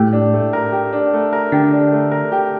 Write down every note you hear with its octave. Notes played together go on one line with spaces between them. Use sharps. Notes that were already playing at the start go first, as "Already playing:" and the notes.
Already playing: A2 G4
D4
A3
A#4
G4
D4
A3
A#4
D3 G4
D4
A3
A#4
G4